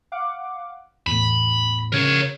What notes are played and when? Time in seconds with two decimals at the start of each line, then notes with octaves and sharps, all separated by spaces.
0.12 F5 F#5 D6
1.07 E2 A2 B5
1.92 C#3 A#4 C#5